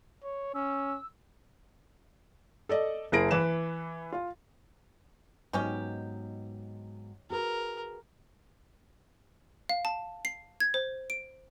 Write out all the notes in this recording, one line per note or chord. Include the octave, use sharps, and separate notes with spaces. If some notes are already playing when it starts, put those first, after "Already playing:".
C#5
C#4 E6
A4 D5 D#5
F#1 E4 G#4 A#4 A#6 D7
E3 B4 E7
F4
G#2 D#3 F#3 B3 C#4 G4
F#4 G#4 A#4 B4
F5
A5
C7
G#6
C5
D7